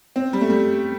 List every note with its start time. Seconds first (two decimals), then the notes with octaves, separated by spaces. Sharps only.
0.16 C4
0.33 G3
0.41 A3
0.50 G3